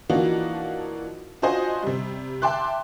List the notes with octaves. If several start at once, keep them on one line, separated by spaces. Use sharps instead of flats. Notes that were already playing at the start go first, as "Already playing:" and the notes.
E3 F3 A#3 D4 D#4 F#4
D4 F4 F#4 C5 D#5 G#5
C3 G3
E5 G5 A5 C6 D6 F#6